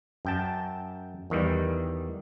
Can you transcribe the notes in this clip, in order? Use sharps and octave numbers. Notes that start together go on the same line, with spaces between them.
F#2 G5 A5
E2 D#3 E3 G3